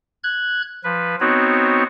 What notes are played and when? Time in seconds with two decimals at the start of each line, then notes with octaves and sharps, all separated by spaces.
0.23 F#6 G#6
0.84 F3 B4
1.20 B3 C4 D#4 F#4 C#5